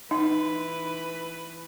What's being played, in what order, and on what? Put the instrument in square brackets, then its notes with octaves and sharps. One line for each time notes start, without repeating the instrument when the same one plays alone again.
[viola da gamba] E3 B4 [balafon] D#4